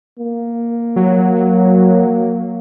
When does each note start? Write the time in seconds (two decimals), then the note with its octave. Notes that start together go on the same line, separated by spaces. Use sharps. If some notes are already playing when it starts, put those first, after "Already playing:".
0.19 A#3
0.96 F#3